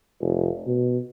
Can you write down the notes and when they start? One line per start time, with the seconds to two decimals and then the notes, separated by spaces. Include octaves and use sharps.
0.21 F1
0.67 B2